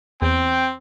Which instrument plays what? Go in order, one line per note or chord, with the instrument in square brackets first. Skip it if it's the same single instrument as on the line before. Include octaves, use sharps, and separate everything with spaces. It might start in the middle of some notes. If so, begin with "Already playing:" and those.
[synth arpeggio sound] E2 [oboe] C4 [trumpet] G5